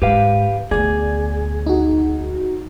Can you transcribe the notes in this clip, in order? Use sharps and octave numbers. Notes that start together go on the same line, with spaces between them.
G#2 G4 B4 F5
D2 B3 G#4 D5
D#4 F#4